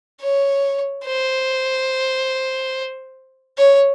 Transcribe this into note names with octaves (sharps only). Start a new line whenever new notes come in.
C#5
C5
C#5